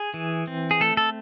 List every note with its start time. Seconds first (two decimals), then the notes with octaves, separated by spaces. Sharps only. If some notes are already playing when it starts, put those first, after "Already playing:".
Already playing: G#4
0.14 E3
0.47 C4
0.71 G#4
0.80 A3 A4
0.97 A4